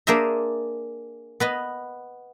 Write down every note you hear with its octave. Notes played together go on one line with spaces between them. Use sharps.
A#3 D4 G#4 C5 E5 A#5
B3 B4 D#5